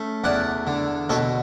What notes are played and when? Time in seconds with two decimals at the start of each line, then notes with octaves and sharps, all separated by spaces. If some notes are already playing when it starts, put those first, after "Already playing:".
Already playing: A3 C#4
0.24 E2 D5 F#5
0.67 D3
1.09 B2 A4 C#5